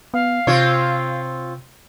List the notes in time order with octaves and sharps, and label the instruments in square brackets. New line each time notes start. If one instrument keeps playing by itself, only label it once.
[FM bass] B3 [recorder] F5
[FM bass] C3 [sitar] C4 F4 C#5